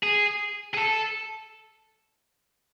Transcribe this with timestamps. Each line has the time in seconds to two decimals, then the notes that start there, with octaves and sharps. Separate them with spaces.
0.03 G#4
0.74 G#4
0.78 A4